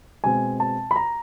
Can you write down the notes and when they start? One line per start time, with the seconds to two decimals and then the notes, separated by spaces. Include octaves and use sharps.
0.24 B2 G#3 C4 G#5
0.60 A5
0.91 B5
0.96 A#5